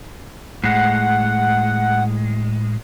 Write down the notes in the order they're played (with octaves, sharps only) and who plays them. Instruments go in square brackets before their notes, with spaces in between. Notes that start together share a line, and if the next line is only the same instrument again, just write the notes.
[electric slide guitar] A2 G#3 [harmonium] F#5